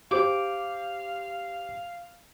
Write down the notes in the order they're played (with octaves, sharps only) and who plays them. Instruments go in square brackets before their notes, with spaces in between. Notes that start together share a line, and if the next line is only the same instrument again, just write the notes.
[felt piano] G4 C5 [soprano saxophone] F5 [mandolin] D6